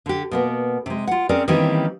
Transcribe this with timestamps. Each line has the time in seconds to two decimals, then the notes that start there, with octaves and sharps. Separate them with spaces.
0.06 D3 G4
0.31 B2 A#3 B3
0.86 C3 G#3
1.07 F4 F#5
1.29 C4 C#4 G#4 A#4 D5
1.48 D#3 E3 G3 A#3 C4 C#4